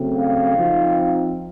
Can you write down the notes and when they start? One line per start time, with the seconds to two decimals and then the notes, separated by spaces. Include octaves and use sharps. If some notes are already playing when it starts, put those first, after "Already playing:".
Already playing: C#3 F#3 A3 C4
0.17 F5
0.57 F3 C4 D#4